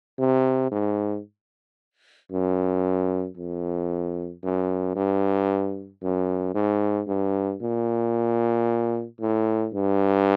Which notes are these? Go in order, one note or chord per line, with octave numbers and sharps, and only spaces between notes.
C3
G#2
F#2
F2
F#2
G2
F#2
G#2
G2
A#2
A2
G2